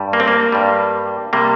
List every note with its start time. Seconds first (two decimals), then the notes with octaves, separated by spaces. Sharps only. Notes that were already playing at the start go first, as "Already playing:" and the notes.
Already playing: G2 G3
0.13 A#3
0.20 C4
0.28 A#3
0.52 G2 G3
1.33 C3 G3 A#3